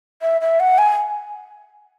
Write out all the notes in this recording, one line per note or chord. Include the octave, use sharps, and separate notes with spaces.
E5
E5
F#5
G#5